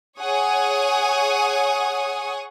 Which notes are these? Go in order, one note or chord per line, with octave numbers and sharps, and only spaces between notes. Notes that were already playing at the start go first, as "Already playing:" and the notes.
G#4 C#5 F#5 G#5 C#6 D#6